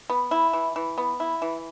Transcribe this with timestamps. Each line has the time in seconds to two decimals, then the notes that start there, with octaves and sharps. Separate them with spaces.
0.10 B3
0.31 E4
0.53 E3
0.76 E3
0.98 B3
1.20 E4
1.42 E3